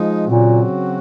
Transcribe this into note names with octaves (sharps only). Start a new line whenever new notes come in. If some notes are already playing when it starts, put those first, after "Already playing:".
Already playing: F3 G#3 D#4
A#2 C#3 F#3 C4 F#4